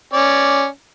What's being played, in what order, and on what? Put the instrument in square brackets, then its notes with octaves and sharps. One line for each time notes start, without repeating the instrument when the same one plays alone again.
[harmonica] C#4 D5